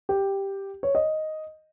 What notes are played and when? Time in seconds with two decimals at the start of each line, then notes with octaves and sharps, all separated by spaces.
0.09 G4
0.83 C#5
0.95 D#5